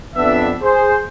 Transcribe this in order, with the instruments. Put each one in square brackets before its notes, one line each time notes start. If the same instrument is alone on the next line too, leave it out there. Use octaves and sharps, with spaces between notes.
[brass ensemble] F2 B3 D4 E5
G#4 C5